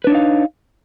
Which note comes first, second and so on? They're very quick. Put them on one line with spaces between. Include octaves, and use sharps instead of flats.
B4 D4 C#5 D#4 F5